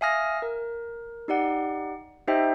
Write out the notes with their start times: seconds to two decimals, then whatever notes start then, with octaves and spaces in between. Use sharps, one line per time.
0.01 E5 F5 G#5 D#6 F6 A#6
0.42 A#4
1.28 D#4 G4 D5 F#5
2.27 D#4 G4 C5 D#5 E5 G5